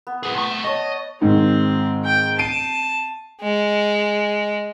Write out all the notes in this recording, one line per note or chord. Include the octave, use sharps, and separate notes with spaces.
B3
G#4 B4
C2 A3
C#5 D#5 A5
G#2 D#3 C4
G5
A5 C7 D7 D#7
G#3